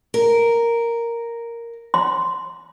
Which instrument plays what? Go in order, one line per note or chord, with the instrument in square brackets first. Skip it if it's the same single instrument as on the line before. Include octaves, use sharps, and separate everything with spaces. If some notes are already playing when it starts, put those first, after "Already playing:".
[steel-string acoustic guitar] A#4
[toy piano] C6